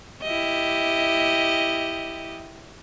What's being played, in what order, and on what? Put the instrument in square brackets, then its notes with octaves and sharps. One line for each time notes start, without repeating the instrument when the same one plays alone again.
[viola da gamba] E4 G4 D#5